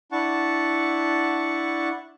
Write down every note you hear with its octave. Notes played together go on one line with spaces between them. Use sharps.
D4 E4 F#5 A5 C#6